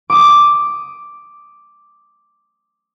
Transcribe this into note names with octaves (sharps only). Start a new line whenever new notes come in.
D6 D#6